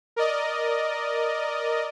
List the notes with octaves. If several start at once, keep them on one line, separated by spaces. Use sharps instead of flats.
A#4 D5 D#5